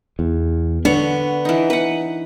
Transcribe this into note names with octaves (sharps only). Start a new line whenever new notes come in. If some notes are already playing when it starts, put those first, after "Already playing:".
E2
D3 B3 D4 C#5
E3 D#4
B4 F#5